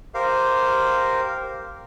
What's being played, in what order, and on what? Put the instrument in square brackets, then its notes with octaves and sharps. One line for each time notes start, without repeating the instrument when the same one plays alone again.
[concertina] G4 A#4 C5 F5